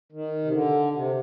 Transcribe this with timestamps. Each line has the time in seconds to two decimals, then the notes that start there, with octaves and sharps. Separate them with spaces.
0.12 D#3
0.45 C3
0.53 D3
0.94 C3